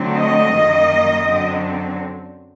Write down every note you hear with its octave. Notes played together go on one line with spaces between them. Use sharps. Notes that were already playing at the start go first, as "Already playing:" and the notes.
Already playing: D3 F#3 A3 C4
D#5
F#2 D#3 G3 A#3
F#2 D3 F#3 C4